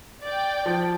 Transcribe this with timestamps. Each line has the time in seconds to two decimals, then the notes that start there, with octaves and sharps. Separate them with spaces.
0.23 D5 G5
0.66 F3